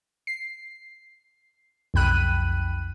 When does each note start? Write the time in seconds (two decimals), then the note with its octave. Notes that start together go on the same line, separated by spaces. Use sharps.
0.27 C7
1.94 B1 F2 G5 B5 F#6 D#7